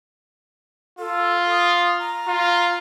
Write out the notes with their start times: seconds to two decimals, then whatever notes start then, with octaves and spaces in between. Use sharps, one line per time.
0.99 F4 A4
1.51 D#6
1.99 A#5
2.28 F4